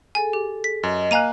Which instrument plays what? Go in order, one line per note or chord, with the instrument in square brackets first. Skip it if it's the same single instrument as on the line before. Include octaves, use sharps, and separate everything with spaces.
[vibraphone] G#4 A4 [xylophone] G#5
[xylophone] G4
B6
[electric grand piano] F#2 [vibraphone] D#5
[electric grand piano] A#3 F5 F#6 [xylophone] G#5 A#5 D#7